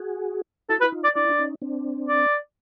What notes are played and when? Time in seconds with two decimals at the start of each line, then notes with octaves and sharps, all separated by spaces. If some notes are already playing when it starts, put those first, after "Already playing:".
Already playing: F#4 G#4
0.69 E4 F#4 A4
0.81 E4 B4
0.92 D#4 F4
1.04 D5
1.15 D4 E4 D5
1.29 D4
1.39 C#4 D#4
1.62 C4 D4
2.08 D5